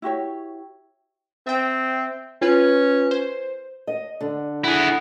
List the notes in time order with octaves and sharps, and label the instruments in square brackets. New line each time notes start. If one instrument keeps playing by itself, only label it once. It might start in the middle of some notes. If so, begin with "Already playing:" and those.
[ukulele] E4 F#4 G4 C#5
[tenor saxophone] C4 [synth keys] E5 G5
[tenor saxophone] C#4 [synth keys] F4 B4
[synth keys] C5
[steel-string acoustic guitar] D#5
D3
[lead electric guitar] E4 G#4 [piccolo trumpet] F#5